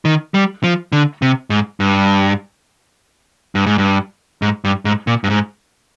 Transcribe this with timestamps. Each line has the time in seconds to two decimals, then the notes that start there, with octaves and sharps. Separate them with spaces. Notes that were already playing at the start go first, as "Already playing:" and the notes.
0.05 D#3
0.34 G3
0.64 F3
0.92 D3
1.22 C3
1.50 G#2
1.80 G2
3.55 G2
3.66 G#2
3.78 G2
4.42 G#2
4.64 G2
4.85 G#2
5.07 A#2
5.24 G2
5.30 G#2